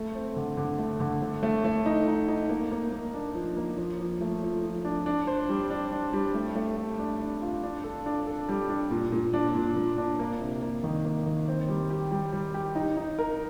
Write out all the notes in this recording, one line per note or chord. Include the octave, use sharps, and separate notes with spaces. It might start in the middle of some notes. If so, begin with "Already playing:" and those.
Already playing: A3
C4
D3
D3
A3
D3
A3
A3
A3
D#4
D#4
D#4
A#3
A#3
A#3
D4
F3
A#3
F3
F3
A3
F3
F3
D4
D4
C5
G3
D4
D4
G3
A3
A3
A3
D4
D4
F4
D4
A4
D4
A4
G3
D4
A#2
A#2
D4
A#2
A#2
D4
A#3
C3
A#3
D#3
A#3
D#3
C4
G3
G4
G3
G3
G4
D#4
D#4
A#4